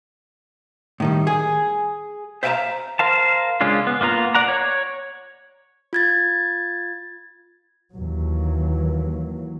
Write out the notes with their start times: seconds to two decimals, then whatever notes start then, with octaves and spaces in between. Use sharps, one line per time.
1.00 A2 D#3 G3
1.27 G#4
2.43 C5 E5 F5 G5 A5 A#5
2.99 A#4 C5 F5 A5
3.61 C#3 G#3 C#4 D4 F4
3.87 B3
4.01 A#3 B3 F4 A#5
4.35 D5 F#5 A#5
4.48 C#5
5.93 F4 G#6 A6
7.94 D#2 E3 F#3